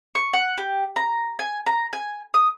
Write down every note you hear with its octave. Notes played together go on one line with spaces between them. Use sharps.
C#6
F#5
G4
A#5
G#5
A#5
G#5
D#6